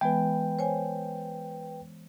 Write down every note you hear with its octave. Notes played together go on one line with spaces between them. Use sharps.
E3 G#3 B3 B4 G5
C5 C#5 G#5